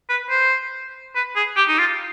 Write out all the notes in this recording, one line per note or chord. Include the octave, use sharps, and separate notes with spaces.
B4
C5
B4
G#4
G4
D#4
F4